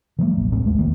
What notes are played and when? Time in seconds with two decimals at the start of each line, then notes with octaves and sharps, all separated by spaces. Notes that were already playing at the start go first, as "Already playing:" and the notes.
0.19 E3 F#3 G#3 A#3
0.36 F1 A#1 A2
0.52 D1 A1 A2 C4
0.65 D#2 G#3 A3
0.78 F1 D#3 A#3